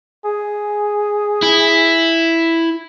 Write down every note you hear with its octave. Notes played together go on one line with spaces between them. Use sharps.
G#4
E4